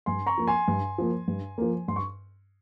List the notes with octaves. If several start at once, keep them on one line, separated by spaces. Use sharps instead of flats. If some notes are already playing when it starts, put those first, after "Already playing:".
G2 G#5 C6
A#5 C#6
F3 A#3
G#5 C6
G2
F3 A#3
G2
F3 A#3
G2 C6
C#6